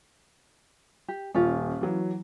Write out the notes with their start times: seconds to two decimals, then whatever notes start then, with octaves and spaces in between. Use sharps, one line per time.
1.08 G4
1.35 D#1 C#4 F4
1.81 E3 F#3